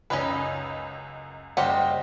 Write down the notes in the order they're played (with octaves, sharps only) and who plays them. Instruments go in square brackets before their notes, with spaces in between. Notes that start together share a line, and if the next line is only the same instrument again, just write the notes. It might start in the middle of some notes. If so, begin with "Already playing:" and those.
[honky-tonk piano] C#2 F#2 D#5 [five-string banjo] C#4 D#4 B4
[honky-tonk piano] F#1 G3 C5 [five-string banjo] G4 D#5 F#5